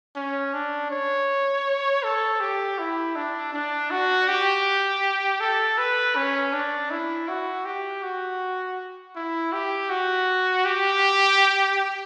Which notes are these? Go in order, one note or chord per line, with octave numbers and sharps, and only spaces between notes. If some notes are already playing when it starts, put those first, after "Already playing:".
C#4
D4
C#5
A4
G4
E4
D4
D4
F#4
G4
A4
B4
C#4
D4
E4
F#4
G4
F#4
E4
G4
F#4
G4